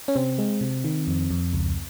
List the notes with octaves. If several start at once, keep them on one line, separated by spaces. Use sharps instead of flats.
C#4
C3 C4
G#3
C3
D#3
F2
F2
C#2